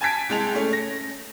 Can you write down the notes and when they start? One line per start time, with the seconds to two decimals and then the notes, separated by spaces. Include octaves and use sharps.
0.01 G#5 A5 G#6 B6 D7
0.29 C2 G#3 A5 F7
0.55 A3 C#4
0.73 A#6